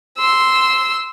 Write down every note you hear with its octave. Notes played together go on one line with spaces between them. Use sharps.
C6 E6